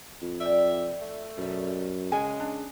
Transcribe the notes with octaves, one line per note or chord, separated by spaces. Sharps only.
F2
D5 E5 F5 G5
A3
F#2 B2 G3
C#3 F#3 G#3 G#5
D4